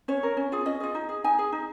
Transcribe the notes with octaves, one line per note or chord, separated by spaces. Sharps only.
C#4 C#5
A#4
C#4
F4 G#4
C#4 D#5
F4 G#4
D#4
G#4
D#4 G#5
G#4
D#4